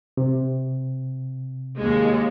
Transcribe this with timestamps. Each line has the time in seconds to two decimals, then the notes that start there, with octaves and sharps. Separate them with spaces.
0.17 C3
1.78 D#2 G#3